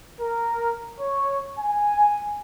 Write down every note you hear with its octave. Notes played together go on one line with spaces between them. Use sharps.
A#4
C#5
G#5